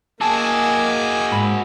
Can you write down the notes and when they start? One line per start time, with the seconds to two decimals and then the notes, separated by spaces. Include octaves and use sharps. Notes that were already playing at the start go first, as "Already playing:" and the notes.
0.21 A#3 F#4 G#4 D#5 G#5 A5 D6 E6
1.32 G#2 B5